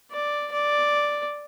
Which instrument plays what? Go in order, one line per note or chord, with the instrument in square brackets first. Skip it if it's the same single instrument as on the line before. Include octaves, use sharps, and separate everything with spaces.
[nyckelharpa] D5
D5